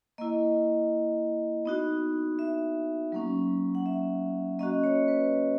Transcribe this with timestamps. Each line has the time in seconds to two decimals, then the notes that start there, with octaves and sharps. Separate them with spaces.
0.18 A#3 E4 D#5
1.65 B3 D#4 F#4
2.39 E5
3.12 F#3 A#3 C#4
3.75 F#5
3.86 E5
4.59 A#3 C#4 F#4 D#5
4.84 C#5
5.08 B4